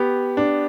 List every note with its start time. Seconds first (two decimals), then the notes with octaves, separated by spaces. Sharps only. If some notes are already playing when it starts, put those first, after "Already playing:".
Already playing: B3 G4
0.37 D4